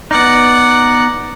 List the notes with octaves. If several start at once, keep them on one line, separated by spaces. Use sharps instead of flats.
B3 D#4 D5 F#5